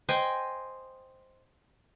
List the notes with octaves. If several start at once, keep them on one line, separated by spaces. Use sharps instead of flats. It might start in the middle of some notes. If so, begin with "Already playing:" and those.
C5 D#5 G5 G#5